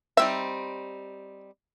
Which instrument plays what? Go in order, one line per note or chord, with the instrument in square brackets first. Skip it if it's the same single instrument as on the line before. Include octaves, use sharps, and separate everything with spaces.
[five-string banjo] G3 C4 D#4 [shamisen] E5